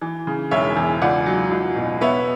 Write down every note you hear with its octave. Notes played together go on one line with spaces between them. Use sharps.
E3
C#3
E1 C#5 E5
E2
C#2 D5 F#5
F#3
C#2
B2
B3 C#5 E5